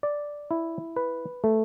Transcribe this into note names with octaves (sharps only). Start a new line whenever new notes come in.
D5
E4
B4
A3